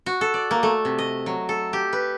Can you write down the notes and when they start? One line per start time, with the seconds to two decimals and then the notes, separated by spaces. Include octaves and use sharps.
0.06 F#4
0.21 A4
0.34 D5
0.51 A#3
0.63 A3
0.85 C3
0.99 D#5
1.26 F#3
1.49 A4
1.73 G4
1.93 B4